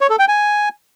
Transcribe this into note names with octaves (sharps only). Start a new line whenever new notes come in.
C#5
A4
G5
G#5